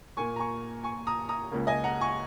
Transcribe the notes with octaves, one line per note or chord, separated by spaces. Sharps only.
A#2 A#3 G#5 C#6
A#5
G#5 C#6
G#5 C#6
A#5 D#6
A#5 D#6
C#2 C#3 A#3
D#5 G#5
F#5 A#5
G#5 C#6